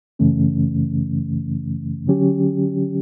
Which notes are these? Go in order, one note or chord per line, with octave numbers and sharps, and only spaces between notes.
F#2 C#3 E3 A3 C#4
D3 F#3 C#4 G4